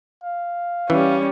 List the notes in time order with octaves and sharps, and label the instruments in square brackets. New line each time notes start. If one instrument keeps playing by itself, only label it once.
[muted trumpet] F5
[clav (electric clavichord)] E3 [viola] G3 C#4